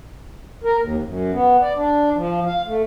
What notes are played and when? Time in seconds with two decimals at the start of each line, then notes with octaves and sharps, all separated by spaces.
0.64 A#4
0.78 D#2
1.04 F#2
1.32 B3
1.62 D5
1.76 D4
2.15 F3
2.46 F5
2.66 A3